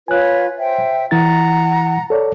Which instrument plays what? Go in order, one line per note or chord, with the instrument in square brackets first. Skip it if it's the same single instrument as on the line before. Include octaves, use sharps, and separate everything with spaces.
[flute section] F4 B4 C#5 [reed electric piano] G#5 F#6
[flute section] C5 E5 G5
[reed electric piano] E3 E4 A6 [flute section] F#5 A#5
[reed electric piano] A4 C#5 D5